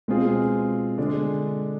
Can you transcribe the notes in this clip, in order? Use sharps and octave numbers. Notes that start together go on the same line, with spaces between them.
B2 G#3 C4 F4 G#4
D3 G#3 D4